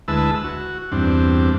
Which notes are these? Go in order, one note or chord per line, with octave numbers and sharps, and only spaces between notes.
D2 G#3 E4 B4 A5 E6
F#4
E2 G2 C4 D4